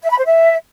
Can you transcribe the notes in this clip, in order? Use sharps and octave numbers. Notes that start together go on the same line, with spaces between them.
E5
B5
C5
E5